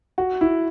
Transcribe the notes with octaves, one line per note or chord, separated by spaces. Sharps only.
F#4
E4